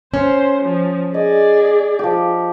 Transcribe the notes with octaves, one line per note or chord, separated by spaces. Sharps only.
C#4 C5
F3
G#4 D5 D#5
F3 G4